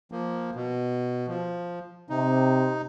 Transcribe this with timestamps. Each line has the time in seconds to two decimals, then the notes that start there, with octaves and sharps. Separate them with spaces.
0.12 F3 A#3
0.55 B2
1.28 F3
2.10 C3 D#4